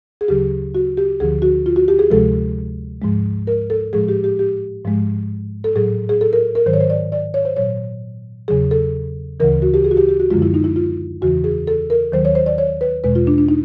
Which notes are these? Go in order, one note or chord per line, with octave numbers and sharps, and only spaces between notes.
G#4
D2 C#3 F#3 G4
F#4
G4
D2 D3 F3 G#4
F#4
F4
F#4
G4
G#4
D2 C3 F3 G#3 A4
G#2 F3 G#3
A#4
A4
A2 F3 G#3 G#4
G4
G4
G4
G#2 F3 G#3
A4
A2 F#3 G#4
G#4
A4
A#4
A#4
G#2 D#3 F#3 C5
C#5
C5
D5
D5
C#5
C5
A#2 F#3 C#5
E2 C#3 F#3 G#4
A4
D2 C#3 E3 A#4
F#4
G4
G#4
F#4
G4
G4
F#4
F#2 D3 F3 G#3 F4
E4
D#4
E4
F4
E2 C#3 E3 F#4
G#4
A4
A#4
D#2 D#3 F#3 C5
C#5
C5
D5
C#5
B4
E2 B2 G#3 B4
F4
D4
D4
D#4